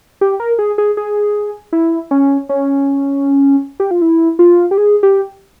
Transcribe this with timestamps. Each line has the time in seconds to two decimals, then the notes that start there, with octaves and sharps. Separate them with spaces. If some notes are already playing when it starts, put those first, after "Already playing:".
0.21 G4
0.40 A#4
0.59 G#4
0.78 G#4
0.97 G#4
1.73 E4
2.11 C#4
2.49 C#4
3.80 G4
3.91 F4
4.02 E4
4.39 F4
4.71 G4
4.78 G#4
5.03 G4